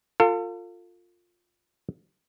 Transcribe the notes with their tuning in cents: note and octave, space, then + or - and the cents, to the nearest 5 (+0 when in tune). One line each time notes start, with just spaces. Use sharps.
F4 +10 A4 +40